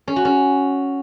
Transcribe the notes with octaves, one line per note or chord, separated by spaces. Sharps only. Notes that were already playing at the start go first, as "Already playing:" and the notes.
C#4
F#4
C#4